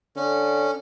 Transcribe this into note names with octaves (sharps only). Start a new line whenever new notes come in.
D3 C#4